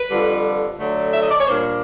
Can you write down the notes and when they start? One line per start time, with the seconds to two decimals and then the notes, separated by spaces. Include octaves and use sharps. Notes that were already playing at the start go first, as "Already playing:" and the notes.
Already playing: B4
0.08 F2 D3 G3
0.78 D3 F#3 A3
1.13 E5
1.21 D#5
1.30 D5
1.39 C#5
1.47 A#2 G3 A#3 D4 C5